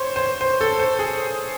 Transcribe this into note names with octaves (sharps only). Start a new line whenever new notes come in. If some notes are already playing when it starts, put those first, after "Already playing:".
Already playing: C5 C#5
C5
C5
A4
C5
G#4